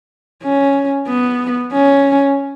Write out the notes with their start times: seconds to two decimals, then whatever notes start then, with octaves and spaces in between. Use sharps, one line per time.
0.43 C#4
1.08 B3
1.73 C#4